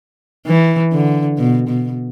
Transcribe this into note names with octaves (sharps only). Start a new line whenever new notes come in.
E3
D3
B2
B2